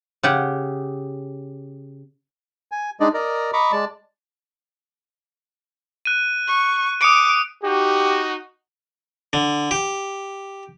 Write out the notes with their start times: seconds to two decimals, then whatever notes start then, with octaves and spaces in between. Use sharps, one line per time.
0.23 C#3 G4 F#5
2.72 G#5
3.00 G#3 D4 D#4 D5 D#5
3.14 A#4 D5 D#5 A#5
3.53 D#5 A#5 B5 C#6 D6
3.72 G#3 D5 A5
6.05 F#6 D#7
6.48 C#6
7.01 D6 D#6 C#7 D7
7.63 D#4 F#4 G4
9.33 D3
9.71 G4